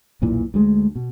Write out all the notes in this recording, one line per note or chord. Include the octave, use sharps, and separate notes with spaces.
B1 E2 A#2 E3
D2 G#3
B2